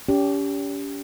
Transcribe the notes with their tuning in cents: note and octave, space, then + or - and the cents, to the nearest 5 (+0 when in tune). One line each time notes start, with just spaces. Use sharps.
C#4 +40 G4 +0